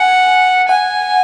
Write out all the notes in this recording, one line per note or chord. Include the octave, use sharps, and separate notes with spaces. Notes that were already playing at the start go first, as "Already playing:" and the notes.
Already playing: F#5 G#5
F#5 G#5